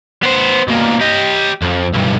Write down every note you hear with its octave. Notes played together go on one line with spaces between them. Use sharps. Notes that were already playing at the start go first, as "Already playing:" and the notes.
B3 C5
B2 A#3
G4 D#5
F2
B1 G2